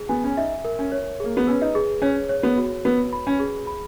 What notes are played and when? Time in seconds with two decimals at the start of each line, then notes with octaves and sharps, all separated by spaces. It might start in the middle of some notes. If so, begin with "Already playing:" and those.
Already playing: G#4
0.09 B3 G#5
0.24 C#4
0.37 D#4 E5
0.65 A#4
0.79 C#4
0.92 C#5
1.20 A#3 G#4
1.37 B3
1.47 C#4 B4
1.62 D#4
1.75 G#4
2.02 C#4 C#5
2.29 C#5
2.43 B3
2.57 F#4
2.85 B3 B4
3.13 B5
3.27 C#4
3.40 G#4
3.67 B5